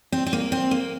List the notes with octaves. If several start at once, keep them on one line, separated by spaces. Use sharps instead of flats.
C4
C4
A#3
C4
A#3